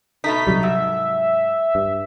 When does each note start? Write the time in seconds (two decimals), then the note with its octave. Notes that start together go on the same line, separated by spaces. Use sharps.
0.24 B2 A3 D#4 B6
0.47 C3 F#3 G3
0.63 G#2 E5
1.75 G2